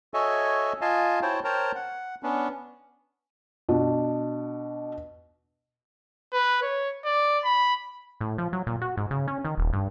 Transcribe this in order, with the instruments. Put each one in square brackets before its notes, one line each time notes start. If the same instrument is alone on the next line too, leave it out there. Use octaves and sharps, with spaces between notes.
[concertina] F#4 A4 C#5 D#5 E5 G#5
F4 D#5 F5 G#5 A5
E4 F#4 C5 C#5 G5 A5
A#4 C5 C#5 G5 A5 A#5
F#5
B3 C#4 D4
[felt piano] B2 D4
[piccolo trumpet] B4
C#5
D5
B5
[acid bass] A2
F3
F#3
A#2
F#4
G#2
C#3
C#4
D#3
D#1
G2